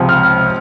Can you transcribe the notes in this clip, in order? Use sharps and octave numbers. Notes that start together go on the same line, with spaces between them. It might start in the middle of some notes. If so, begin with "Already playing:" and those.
Already playing: C#2 C3 F3 C4
F6